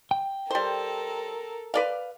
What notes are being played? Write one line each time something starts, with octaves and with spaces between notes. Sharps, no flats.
G5
G3 A4 A#4 C5
B4 D5 F5